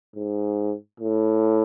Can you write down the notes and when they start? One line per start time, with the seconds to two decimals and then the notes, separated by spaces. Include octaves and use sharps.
0.16 G#2
1.00 A2